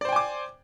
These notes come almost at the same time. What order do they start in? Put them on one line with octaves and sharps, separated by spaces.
D5 C5 G5 G#5 D6